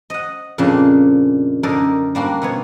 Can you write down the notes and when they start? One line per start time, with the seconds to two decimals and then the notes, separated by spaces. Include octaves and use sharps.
0.10 D#5 F#5
0.58 F2 A#2 C#3 G#3 D4 C6
1.63 F#2 D3 D#4 A4 A#4 D5
2.15 G3 A#3 D4 F#4
2.42 B2 B3 C#5